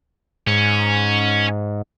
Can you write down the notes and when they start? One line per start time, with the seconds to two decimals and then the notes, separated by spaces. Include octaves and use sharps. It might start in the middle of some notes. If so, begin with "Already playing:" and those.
0.47 G#2 C#4